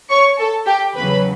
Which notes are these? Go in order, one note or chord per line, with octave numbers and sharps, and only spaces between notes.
C#5 C#6
A4 A5
G4 G5
E2 C#3 F#3 B4 B5